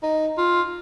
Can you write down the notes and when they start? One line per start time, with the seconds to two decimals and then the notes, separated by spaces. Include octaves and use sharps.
0.03 D#4
0.38 F4